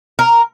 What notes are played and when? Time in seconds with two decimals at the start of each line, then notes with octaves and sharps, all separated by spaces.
0.19 A#4